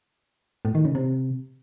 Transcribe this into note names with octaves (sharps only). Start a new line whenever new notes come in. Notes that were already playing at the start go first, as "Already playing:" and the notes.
A2
D#3
C#3
C3